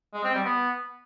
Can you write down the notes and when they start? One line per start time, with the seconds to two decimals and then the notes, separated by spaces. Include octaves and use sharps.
0.13 G#3
0.24 C4
0.34 G3
0.45 B3